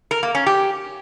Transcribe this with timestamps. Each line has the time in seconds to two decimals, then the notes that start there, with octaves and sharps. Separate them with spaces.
0.11 A#4
0.23 A#3
0.35 C#4
0.46 G4